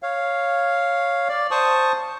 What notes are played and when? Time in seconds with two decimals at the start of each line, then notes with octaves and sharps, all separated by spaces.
0.03 C#5 F5
1.29 D5
1.51 C5 A5 C#6 D#6